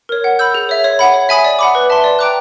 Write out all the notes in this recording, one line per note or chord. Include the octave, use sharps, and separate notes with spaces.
A#4 C#5
F#5
B5 E6 G6
G#4
C#5 E5
C#5
F#5 B5
C#5
E5 G#5 B5 D#6
D5
F#5 B5 D6
B4
E5 A5 C6
D5
G5 A#5 D6 F#6